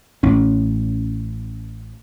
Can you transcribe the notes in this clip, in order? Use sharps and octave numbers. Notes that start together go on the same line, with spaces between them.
A1 C#4